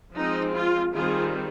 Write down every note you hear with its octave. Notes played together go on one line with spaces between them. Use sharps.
F3 G#3 C4 D#4
F4
D#3 G3 C4 F4 G#4